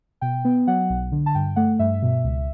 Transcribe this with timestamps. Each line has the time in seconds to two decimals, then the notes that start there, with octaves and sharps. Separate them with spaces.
0.21 B2 G5
0.45 B3
0.67 F#3 F#5
0.90 B1
1.12 D3
1.26 A5
1.35 G2 G5
1.56 A3 F#5
1.79 G2 E5
2.02 B2
2.24 C#2